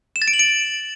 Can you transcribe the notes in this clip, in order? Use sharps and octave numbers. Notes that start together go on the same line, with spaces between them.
E7
A6
D7
F#7
D7